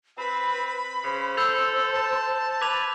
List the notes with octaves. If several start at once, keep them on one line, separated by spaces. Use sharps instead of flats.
C4 B4 B5
C#3 C5
A4 E6 G6 F7
A5
B4 D6 G#6 F7